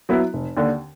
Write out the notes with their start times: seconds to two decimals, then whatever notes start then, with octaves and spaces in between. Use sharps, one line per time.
0.09 F#3 B3 E4
0.33 F1
0.57 D#2 D3